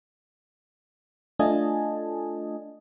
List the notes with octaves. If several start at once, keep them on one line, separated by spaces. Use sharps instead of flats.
A3 D4 F4 D#5 G#5 A5